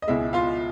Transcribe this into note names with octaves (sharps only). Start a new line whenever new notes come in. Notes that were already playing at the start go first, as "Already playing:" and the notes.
D#5
C#2 B2 G#3 E4 E5
F4 F5